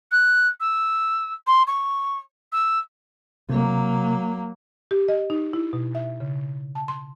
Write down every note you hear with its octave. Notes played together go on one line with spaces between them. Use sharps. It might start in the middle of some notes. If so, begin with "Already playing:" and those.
F#6
E6
C6
C#6
E6
C3 F#3 A#3
G4
D#5
D#4
E4
B2
E5
C#3
A5
C6